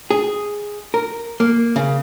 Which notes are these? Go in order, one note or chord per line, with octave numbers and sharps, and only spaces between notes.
G#4
A#4
A#3
C#3